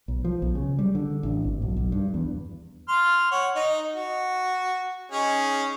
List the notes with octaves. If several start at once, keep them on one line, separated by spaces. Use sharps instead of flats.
B1
F3
B1
C#3
G3
D3
A1
G#1
B1
B1
G2
E2
C6 F6
C#5 F#5
D#4 D#5
F#4
C#4 D#4 G#4